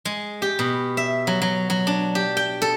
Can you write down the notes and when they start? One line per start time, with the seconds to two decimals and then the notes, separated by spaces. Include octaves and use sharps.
0.05 G#3
0.42 G4
0.59 B2
0.97 E5
1.27 F#3
1.42 F#3
1.70 F#3
1.87 D4
2.15 G4
2.37 G5
2.62 A4